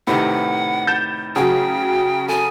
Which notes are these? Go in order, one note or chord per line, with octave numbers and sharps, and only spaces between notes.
A2 C3 D#3 B4 F#5
G6 A6 E7
C#3 F#3 F#4 G#4 G5
A4 G#5 D#6